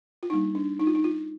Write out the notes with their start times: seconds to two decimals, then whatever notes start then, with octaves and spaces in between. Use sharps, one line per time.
0.23 F4
0.30 G3 A#3 D4 D#4
0.55 D4
0.80 D#4
0.87 F4
0.95 D#4
1.04 F4